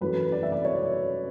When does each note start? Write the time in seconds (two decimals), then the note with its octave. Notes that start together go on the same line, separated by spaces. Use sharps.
0.01 F#2 E3 A3 B4
0.32 D5
0.43 E5
0.52 D5
0.65 C#5